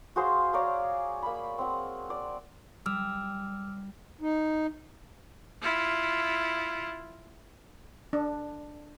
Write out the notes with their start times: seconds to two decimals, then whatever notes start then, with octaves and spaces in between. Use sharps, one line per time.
0.16 F#4 G#4 C5 F5
0.53 C#5 D5 F5 A#5
1.22 A#3 B5
1.58 C4 F#5
2.10 D5
2.86 G3 D6 E6 F6
4.21 D#4
5.62 E4 F4
8.13 D4